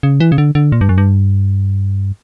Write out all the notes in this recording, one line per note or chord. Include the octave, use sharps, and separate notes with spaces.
C#3
E3
C#3
D3
D3
A#2
G2
F#2
G2